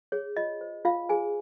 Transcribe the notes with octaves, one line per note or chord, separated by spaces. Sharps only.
G#4 C#5
F4 D#5
C5
F4 F5
G#4 C5 G#5